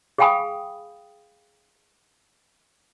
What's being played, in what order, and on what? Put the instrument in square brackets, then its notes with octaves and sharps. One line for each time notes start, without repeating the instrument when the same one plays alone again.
[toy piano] G#4 F5 G5 G#5 B5 D#6